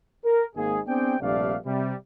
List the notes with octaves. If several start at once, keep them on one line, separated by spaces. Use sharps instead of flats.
A#4
G#1 G#2 A#3 G#4
B3 C4 D4 G#4 D5 G5
A#1 G2 C3 A3 D5 F5
C3 G3